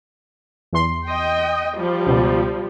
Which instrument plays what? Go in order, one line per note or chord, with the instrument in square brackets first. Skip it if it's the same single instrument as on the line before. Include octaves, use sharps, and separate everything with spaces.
[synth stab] E2 C6
[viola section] D#5 G5
F3 G3
[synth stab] C#2 B2